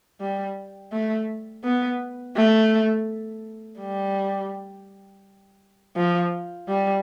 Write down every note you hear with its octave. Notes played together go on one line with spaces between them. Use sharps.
G3
A3
B3
A3
G3
F3
G3